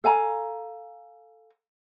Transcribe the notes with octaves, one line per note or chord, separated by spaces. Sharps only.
A4 F5 G#5 A#5